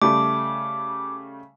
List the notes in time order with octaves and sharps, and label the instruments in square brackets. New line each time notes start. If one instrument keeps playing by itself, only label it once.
[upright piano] C#3 G3 A3 [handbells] D6